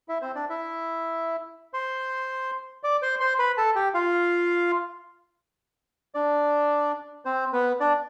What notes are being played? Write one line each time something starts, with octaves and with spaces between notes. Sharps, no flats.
E4 E5
C4 C5
D4 D5
E4 E5
C5 C6
D5 D6
C5 C6
C5 C6
B4 B5
A4 A5
G4 G5
F4 F5
D4 D5
C4 C5
B3 B4
D4 D5